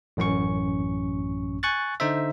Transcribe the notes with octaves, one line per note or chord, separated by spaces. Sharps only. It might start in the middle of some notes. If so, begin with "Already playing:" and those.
A1 F#2 C#4 C#6
G#5 C#6 F#6 A6
D3 D#4 C5 E5